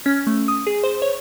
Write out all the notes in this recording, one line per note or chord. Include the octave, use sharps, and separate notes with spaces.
C#4
A3
D#6
G#4
C5
C#5